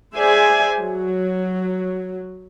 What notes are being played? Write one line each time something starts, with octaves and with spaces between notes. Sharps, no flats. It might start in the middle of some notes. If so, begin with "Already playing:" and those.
G#4 C5 D5 E5 G#5
F#3